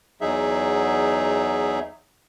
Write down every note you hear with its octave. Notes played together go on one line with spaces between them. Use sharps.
E2 F#3 D#4 G#4 E5